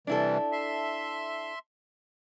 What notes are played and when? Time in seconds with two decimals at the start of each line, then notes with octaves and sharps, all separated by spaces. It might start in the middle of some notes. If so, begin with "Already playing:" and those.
0.07 C3 E3 G3 D4 E4 A4
0.52 E5 C6